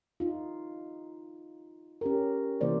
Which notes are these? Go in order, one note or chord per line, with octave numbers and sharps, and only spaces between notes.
D#4 F4
C#4 G4 A#4
C3 E3 A#3 C5 D5